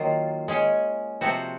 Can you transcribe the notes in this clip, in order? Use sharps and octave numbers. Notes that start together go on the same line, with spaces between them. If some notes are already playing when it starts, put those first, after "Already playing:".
Already playing: D#3 F#3 A#3 F4
G#3 C#4 G#4
C3 F3 C4 F#4